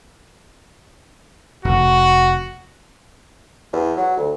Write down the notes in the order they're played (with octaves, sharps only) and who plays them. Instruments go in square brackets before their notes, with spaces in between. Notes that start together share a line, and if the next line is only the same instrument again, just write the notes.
[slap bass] F1 [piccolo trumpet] F#4
[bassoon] E2
F#3
D2